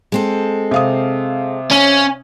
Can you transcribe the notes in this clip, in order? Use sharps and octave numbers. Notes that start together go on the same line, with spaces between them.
G#3 C4 A4
C3 F5 D#6
C#4